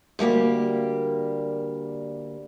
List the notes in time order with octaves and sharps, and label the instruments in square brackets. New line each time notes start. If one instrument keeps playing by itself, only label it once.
[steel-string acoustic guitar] D2 G3 A#3 G4